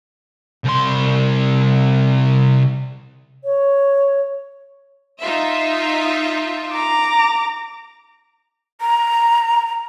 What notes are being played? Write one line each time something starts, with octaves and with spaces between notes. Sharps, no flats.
C2 C6
C#5
D#4 F4 E5
A#5 D6
A#5